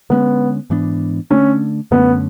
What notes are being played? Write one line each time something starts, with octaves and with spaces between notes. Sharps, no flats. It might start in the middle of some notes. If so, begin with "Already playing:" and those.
D3 G#3 B3 C#4
G#2 E3 B3 D4
D3 A3 C#4 D4
F#2 D3 A3 B3 C#4